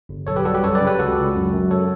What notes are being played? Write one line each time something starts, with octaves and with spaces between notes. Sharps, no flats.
G1
B1 A4 C#5
G4 B4
G3 F#4 A4
G4 B4
F#2 A4 C#5
B4 D5
C#3
G4 B4
C#2 F#4 A4
C#2
F#2
F#2
A4 C#5